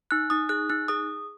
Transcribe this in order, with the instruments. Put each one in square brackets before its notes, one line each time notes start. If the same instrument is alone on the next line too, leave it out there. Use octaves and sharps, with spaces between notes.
[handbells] D#4 F#6
D#4 D#6
G#4 F#6
D#4 F#6
G#4 D#6